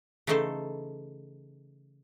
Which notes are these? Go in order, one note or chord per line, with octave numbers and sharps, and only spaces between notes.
C#3 E3 A3 D#4 A4 C5